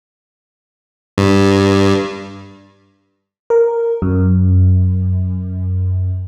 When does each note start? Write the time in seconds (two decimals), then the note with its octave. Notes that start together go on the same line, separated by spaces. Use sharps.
1.18 G2
3.50 A#4
4.02 F#2